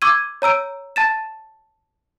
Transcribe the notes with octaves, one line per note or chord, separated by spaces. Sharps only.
C#6 D6 E6 G#6 D#7
C#5 A#5 E6 D7
A5 A6 E7